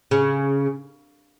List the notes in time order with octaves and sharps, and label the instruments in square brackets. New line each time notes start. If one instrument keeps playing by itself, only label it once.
[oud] C#3